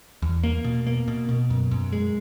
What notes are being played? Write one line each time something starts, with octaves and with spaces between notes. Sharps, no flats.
E2
A#3
B2
A#3
B2
B2
F#2
F#2
G#3